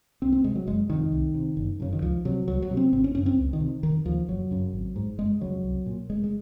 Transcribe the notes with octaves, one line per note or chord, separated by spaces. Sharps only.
C2 C4
C4
C3 G#3
F#3
F#1 G#3
F2 C3 D#3
C2
C3
F#1
F#2 C#3
D#3
C#2 F3
C3 F#3
C#2 F#3
F#3
C3
C4
G#1 C4
C#4
F#2 C#3 C#4
C4
C#2
D#3
C3
F1 D#3
D#2 C#3 F3
F#1 F#3
F#2 C#3
G#1
G#2
F#1 G#3
F2 C#3 F#3
C2
A#2
F1 G#3
G#3